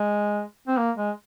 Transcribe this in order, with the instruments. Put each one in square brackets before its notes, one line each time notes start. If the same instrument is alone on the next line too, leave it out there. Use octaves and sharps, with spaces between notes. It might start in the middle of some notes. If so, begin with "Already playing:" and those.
Already playing: [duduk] G#3
C4
A#3
G#3